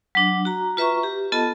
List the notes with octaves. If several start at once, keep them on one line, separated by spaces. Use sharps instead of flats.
F#3 D4
F#4 A#5
F4 B4 E5 A#5 C#6
G4
B3 F4 A4 D#5 A5